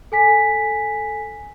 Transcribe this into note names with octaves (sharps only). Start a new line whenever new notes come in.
A4 G#5 B6